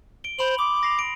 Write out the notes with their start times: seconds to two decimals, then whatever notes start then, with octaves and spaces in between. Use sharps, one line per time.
0.24 D7 G7
0.39 C5 B5 C6 F#7
0.59 D6 D#6
0.83 A#6 C7 F7
0.99 D7